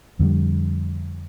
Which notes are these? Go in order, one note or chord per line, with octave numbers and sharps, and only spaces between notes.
F2 D3 G3